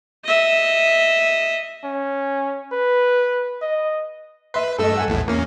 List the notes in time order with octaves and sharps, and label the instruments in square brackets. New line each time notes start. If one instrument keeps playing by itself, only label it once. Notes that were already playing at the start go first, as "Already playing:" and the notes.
[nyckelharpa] D#5 E5
[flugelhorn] C#4
B4
D#5
[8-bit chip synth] B4 [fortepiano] E5 C6
[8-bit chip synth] G2 A3 E6 [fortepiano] A4 D#5
[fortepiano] A4 F#5 G#5
[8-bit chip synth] A#1 E2 A2
[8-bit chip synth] E2 C#4 [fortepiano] A#3